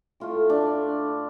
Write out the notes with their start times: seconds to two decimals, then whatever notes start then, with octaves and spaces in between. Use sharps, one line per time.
0.20 A2 A3 F4
0.50 D4